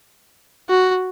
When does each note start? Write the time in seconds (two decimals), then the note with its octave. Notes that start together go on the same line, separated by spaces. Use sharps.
0.69 F#4